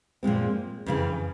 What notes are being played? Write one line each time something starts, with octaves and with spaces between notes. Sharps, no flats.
A#2 F3 G#3 C4
F2 C#3 E3